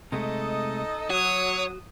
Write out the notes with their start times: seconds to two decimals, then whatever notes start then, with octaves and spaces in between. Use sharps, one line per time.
0.12 C3 G#3 A3 D#4 A4 D#5
1.10 F#3 F#4 C#5 D#6